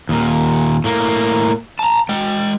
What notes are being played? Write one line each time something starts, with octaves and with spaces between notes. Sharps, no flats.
D#2 A#2
A2 A#3
A5 A#5
G#3 G5